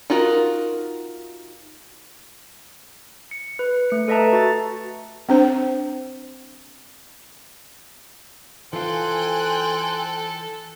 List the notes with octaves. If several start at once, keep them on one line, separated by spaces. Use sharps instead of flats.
D#4 F4 F#4 A#4
C#7
B4
A3 C#7
A4 B4 D#5 E5 A5 A#5
F#4 A6
C4 D4 C5
E3 F4 A4 C5 G5 G#5 F#6